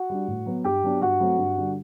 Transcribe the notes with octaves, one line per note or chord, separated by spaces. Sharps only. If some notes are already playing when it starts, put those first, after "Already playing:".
Already playing: F#4 F#5
G3 D4
A2
F#3 B3
G2 G4 G5
F#3 B3 D4
G2 F#4 F#5
F#3 A3 C4
G2
D3 G3 D4